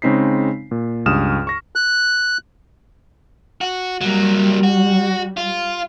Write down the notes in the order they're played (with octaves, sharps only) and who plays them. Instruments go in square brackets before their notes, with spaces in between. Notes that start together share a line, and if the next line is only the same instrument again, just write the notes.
[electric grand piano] C#3 G#3 C4 D#4 B6 C7
A#2
C#2 G2 D#6 F6 E7
C#6 A#6
[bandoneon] F#6
[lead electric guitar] F#4
[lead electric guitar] F#3 A#3 [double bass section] G3
[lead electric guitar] F#4
F4